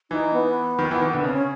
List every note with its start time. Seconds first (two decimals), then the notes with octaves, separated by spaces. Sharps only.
0.11 E3 D#4
0.33 B3
0.79 D#3
0.91 E3
1.02 D#3
1.13 D3
1.24 C#3 C4
1.33 C#4